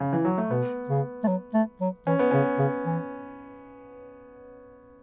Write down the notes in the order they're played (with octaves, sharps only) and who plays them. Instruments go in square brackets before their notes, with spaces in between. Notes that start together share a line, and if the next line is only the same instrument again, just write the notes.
[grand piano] C#3
E3
F#3
A3
[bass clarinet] B2 [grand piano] B3
[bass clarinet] C#3
A3
F#3
A3
F#3
[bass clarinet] E3 [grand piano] C#4
[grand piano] B3
[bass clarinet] C#3 [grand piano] C#4
[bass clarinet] C#3
E3